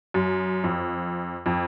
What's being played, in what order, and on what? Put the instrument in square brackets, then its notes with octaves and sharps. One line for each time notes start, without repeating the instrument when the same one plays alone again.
[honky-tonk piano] F#2
F2
F2